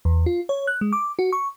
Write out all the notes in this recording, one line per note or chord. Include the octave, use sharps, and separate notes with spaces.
E2
F4
C#5
F#6
G#3
D6
F#4
C#6